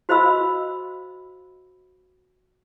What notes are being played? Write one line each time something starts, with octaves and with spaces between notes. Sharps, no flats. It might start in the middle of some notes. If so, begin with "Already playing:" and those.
F#4 C5 D#5 F5 B5 E6